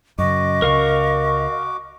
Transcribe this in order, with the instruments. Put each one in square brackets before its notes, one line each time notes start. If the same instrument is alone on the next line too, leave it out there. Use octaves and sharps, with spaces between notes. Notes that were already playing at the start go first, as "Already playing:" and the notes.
[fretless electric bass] F#2 C#3 [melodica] F#4 D6 [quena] D#5
[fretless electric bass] C#2 C#3 [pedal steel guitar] A#4 F5 C#6